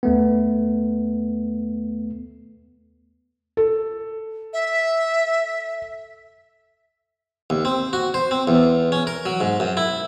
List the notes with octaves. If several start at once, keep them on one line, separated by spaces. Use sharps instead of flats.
D#2 A3 B3
A4
E5
D#2
C4
F#4
C5
C4
E2
C#4
A#4
F#3
G#2
F#2
E4